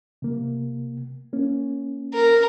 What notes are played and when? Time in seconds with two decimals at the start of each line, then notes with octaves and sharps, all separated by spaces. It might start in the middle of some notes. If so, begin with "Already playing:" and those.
0.22 C3 A#3
1.33 A#3 C#4
2.14 A#4